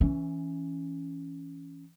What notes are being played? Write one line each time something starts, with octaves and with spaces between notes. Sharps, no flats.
E3 C#4